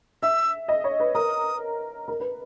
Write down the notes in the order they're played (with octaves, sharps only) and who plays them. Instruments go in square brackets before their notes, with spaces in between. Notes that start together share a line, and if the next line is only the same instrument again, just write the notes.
[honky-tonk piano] E5 [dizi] E6
[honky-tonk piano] D#5
C#5
B4
[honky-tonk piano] A#4 [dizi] D#6
[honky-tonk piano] A#4
B4